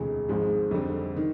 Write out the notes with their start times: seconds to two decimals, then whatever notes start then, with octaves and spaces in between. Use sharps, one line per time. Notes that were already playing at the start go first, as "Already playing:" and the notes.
Already playing: E1 D2 C3 E3 G#3
0.28 G#1 G#2 F3 G#3
0.71 F2 D3 G3 C4
1.17 D#3